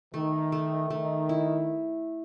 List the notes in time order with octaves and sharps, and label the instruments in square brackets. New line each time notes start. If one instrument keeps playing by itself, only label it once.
[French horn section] D#3 [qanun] A3
[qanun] A3
[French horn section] D#3 [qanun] A3
[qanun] E4